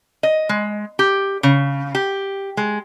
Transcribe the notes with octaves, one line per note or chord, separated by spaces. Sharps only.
D#5
G#3
G4
C#3
G4
G#3